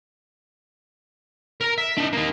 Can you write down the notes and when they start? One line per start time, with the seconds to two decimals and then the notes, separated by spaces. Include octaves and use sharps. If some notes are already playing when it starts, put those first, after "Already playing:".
1.61 A#4 A#5
1.78 E5
1.97 D4 D#4
2.13 A#3 D#4